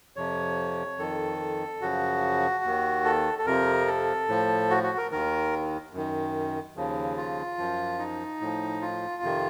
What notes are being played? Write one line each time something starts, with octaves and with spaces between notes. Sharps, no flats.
F2 C3 F3 C#5
F2 D#3 A4
F#2 C#3 F3 F#4
D#2 D#3
A4
A4
F2 C3 F3 A#4
A4
A2 F3
F#4
F#4
A#4
D#2 D#3 A#4
F#2 D#3
D#2 C#3 F3
F4
F#2 F3
D#4
A2 F3
F4
F2 C3 D#3